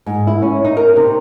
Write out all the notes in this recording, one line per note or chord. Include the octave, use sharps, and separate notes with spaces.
G#2
E4
C#4
D#4
A#4
C3